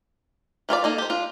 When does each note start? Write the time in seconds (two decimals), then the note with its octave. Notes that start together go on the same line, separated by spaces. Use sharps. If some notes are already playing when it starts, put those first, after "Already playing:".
0.69 E3 F4 G#4 D5
0.84 A#3 D#4 A4
0.98 G4 C5
1.10 D4 F4